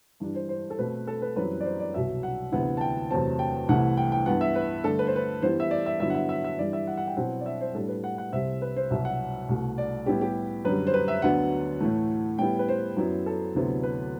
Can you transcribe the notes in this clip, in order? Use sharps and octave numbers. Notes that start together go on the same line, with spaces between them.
G2 E3 G3 D4
C5
C5
A4
B2 A3 C4 B4
A4
B4
F#2 E3 G3 C4 B4
D5
C5
D5
C2 B2 F#3 E5
F#5
D2 C3 E3 B3 E4 F#5
A5
G5
E2 C3 F#3 A3 C4 A5
G5
C2 C3 E3 A3 E4 F#5
G5
G5
G2 E3 B3 E4 F#5
E5
B4
G2 D3 A3 D4 A4
B4
C5
B4
G2 E3 G3 B3 E4 C5
E5
D5
E5
G2 D3 F#3 B3 E4 E5
F#5
E5
E5
E5
G2 E3 G3 D5
E5
F#5
F#5
G5
B2 F#3 C4 E4 F#5
D5
E5
C5
A2 G3 D4 A4
B4
F#5
F#5
C2 C3 G3 C4 E5
B4
C5
C2 B2 F#3 E5
F#5
C2 B2 A3
D5
A2 G3 B3 E4 G4
G4
F#2 D3 G3 B4
C5
B4
E5
D2 D3 F#3 B3 D4 F#5
A2 E3 A3
A2 G3 B3 E4 G5
B4
C5
F#2 F#3 B3 E4
A4
D2 C3 F#3 B3 E4
B4